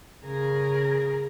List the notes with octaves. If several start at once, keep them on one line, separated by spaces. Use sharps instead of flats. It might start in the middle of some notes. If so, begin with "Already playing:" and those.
C#3 G#4 A#4